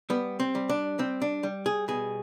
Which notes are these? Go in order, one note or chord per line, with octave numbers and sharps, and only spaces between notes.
G3 B3
C4
G3
D4
G3 C4
D4
G3
G#4
B2 G#4